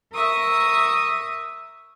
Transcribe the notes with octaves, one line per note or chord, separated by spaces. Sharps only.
A#4 E5 C#6 D#6